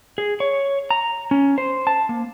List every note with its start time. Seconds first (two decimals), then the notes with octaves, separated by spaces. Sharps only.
0.18 G#4
0.40 C#5
0.90 A#5
1.31 C#4
1.58 C5
1.87 A5
2.09 A#3